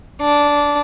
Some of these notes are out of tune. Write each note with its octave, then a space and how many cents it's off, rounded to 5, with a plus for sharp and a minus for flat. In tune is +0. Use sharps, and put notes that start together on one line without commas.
D4 -10